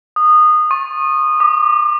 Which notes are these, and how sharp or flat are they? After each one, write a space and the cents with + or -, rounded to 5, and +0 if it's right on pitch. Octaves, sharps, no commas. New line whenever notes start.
D#6 -20
C#6 -30
D6 +35